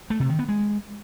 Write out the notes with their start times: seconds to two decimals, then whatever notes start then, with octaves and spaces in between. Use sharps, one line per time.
0.10 A3
0.20 C3
0.29 D#3
0.39 B3
0.49 G#3